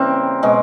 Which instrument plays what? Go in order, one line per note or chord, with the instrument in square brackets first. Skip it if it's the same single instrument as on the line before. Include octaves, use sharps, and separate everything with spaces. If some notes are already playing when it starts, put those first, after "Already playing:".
Already playing: [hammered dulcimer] C#3 E3 G3 A#3 C4
B2 G#3